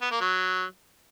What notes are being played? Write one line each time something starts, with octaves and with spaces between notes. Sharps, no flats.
B3
A#3
F#3